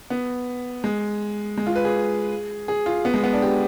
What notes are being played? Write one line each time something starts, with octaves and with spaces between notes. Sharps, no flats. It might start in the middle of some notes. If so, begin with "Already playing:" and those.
B3
G#3
G#3
F4
B4
G#4
G#4
F4
B3
G#3
B3
D4
G4